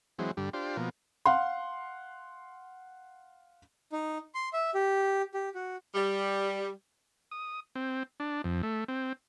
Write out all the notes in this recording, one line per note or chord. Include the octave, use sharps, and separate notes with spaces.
E3 F#3 G#3 C4
G2 D3 G3
D4 F4 G4 C5
B2 F3 A#3
F5 F#5 C6
D#4
C6
E5
G4
G4
F#4
G3
D#6
C4
D4
F2
A3
C4